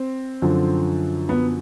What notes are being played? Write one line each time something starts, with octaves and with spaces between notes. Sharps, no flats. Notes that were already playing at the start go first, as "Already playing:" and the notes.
Already playing: C4
F#2 D3 F3
B3